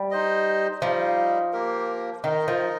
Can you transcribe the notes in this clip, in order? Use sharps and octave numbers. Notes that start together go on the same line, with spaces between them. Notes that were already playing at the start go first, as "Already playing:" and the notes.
Already playing: G3
D#4 C5 D#5
F3 G3 D#4 G4 D#5
A#3 G4 A#4
D#3 D#4 A#4 D#5
F3